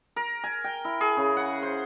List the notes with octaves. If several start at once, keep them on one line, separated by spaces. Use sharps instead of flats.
A#4
G#5
G5
E4
G#4
C#3
F#5
C5